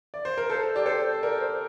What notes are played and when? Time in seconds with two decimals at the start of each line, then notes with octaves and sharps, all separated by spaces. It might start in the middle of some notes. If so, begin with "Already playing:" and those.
0.14 D5
0.25 C5
0.38 A#4
0.49 A4 C5
0.75 G4 D5
0.86 A4 C5
1.22 A#4 D5
1.40 C5